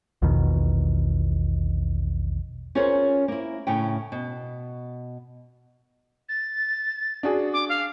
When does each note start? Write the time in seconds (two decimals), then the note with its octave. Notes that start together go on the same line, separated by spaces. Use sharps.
0.22 A#1 E2 B2 D#3
2.75 C#4 F4 G#4 A#4 C5 C#5
3.28 A#3 E4
3.67 A2 C#3 C#4 G5
4.12 B2
6.29 A6
7.23 D4 F#4 G#4
7.53 D6
7.69 F5